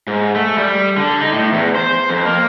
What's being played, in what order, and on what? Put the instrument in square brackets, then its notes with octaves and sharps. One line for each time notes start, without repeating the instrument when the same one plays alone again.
[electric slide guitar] G#2
A3
G3
D3
D#4
A2
E2
C5
F2
A#3